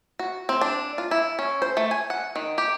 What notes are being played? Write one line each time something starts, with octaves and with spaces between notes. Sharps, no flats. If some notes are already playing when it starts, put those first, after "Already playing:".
F#4
C4
D4
F4
E4
C#4
C5
A3
G#5
F#5
D#3
G4